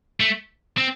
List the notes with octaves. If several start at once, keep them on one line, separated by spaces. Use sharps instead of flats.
A3
C4